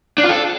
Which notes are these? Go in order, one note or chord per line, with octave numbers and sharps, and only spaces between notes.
D4
F4
A4